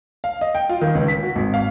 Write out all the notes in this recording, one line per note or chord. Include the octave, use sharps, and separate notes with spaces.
F5
D#5
G5
F4
D#3
C#2
B6
F#4
G#1
F5